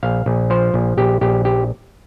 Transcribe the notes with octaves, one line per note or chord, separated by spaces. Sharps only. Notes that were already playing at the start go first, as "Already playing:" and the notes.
A#1 F5
A#1
F3 C5
A#1
A#1 G4
A#1 G4
G4